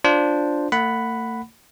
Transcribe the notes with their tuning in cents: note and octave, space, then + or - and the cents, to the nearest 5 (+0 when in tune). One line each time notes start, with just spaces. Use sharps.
D4 +0 F4 +0 C5 +0
A3 +45 F#5 +0 B5 +5